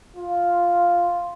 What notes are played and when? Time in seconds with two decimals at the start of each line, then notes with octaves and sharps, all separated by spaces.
0.17 F4